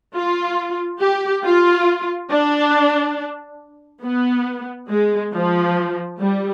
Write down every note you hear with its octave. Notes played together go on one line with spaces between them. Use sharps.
F4
G4
F4
D4
B3
G#3
F3
G3